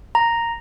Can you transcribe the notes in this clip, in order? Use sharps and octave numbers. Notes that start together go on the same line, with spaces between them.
A#5